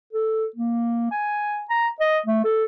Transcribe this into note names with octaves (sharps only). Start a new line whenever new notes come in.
A4
A#3
G#5
A#5
D#5
A3
A4